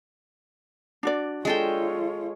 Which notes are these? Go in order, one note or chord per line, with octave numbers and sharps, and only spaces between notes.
D4 F#4 D5
G#3 F4 A4 C#5 G5